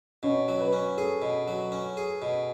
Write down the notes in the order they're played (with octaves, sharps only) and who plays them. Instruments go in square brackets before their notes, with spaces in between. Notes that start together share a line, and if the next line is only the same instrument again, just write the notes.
[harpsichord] B2 [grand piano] C#4
[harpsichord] F#3
[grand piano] B4
[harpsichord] C#4
[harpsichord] G#4 [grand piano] A4
[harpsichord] B2
F#3
C#4
G#4
B2